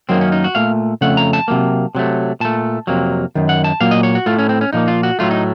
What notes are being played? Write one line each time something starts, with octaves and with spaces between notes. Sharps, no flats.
F#2 D#3 F#3 A#3 C4
C#4
D#4
F#4
A#2 A3 F5
F2 C#3 A3 F#5
A#5
A5
C3 F#3 A#3
C3 F#3 A3
A#2 A3 A5
F2 C3 F#3 A#3
F#2 D#3
F#5
A5
A#2 F#3 A#3 F5
D#5
C#5
F#4
A2 A3 F4
C#4
C4
C#4
A#2 F3 A#3 D#4
F4
F#4
A2 F#3 A3 F4
D#4